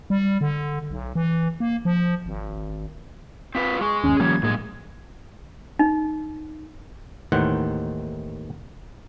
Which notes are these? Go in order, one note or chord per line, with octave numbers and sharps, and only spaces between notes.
G3
D3
B1
E3
A#3
F3
G#1
C4 F4 B4 B6
G#3 G#4 C#6
G1 D#2 C#4
D#3 F3 G3 A#3 C#4 G#6
F#2 A2 G#3 A#3
D#4
D#2 A2 D#3 E3 C5 F#5